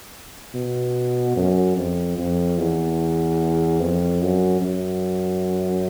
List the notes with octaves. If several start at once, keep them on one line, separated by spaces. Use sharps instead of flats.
B2
F#2
F2
F2
E2
F2
F#2
F#2